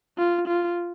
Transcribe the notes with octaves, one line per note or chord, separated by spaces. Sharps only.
F4
F4